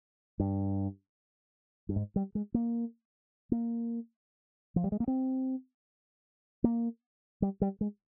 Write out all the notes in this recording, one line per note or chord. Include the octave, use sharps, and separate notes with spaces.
G2
G2
G#2
G3
G#3
A#3
A#3
F3
G3
G#3
A#3
C4
A#3
G3
G3
G#3